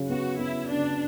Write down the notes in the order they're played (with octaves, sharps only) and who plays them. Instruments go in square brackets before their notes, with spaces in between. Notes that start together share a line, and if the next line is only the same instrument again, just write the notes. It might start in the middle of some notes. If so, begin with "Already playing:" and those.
Already playing: [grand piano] C#3 F#3
[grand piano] B3 [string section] F#4
[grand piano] B3 [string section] E4
[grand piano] C#3 [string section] D4